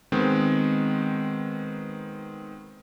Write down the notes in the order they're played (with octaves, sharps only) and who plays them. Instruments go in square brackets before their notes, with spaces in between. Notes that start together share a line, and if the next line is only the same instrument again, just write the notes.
[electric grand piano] D#3 G#3 B3 C4